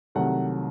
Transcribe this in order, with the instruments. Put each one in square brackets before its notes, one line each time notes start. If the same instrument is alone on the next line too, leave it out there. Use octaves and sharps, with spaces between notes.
[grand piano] C2 C3 D#3 F#3 A3 F#5